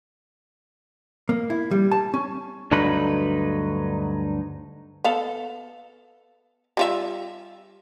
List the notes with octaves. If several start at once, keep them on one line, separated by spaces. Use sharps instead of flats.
A#3
E4
G3
A5
C#4
D2 G2 D3 F#3 D#4 B4
B3 A4 F5
G3 F4 E5